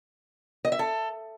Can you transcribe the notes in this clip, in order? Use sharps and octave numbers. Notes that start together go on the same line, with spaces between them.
D#5
E5
A4